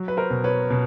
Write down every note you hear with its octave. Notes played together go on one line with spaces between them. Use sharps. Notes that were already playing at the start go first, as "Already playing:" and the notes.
Already playing: F#3
B4
A#4 C5
B2
B4 C#5
B2